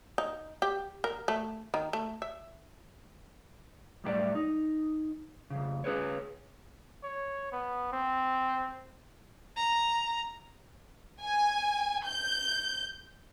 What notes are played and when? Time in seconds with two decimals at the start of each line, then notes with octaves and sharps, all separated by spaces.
0.18 D#4
0.62 G4
1.04 A#4
1.28 A3
1.74 D#3
1.93 A3
2.22 E5
4.04 F#2 A2 G3 G4 A4 D5
4.35 D#4
5.50 F2 C#3
5.84 C#4 G#4 B4 C#5
7.03 C#5
7.52 B3
7.92 C4
9.57 A#5
11.22 G#5
12.06 G6